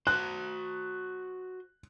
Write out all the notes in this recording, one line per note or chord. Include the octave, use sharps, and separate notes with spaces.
F#4 C5 F#6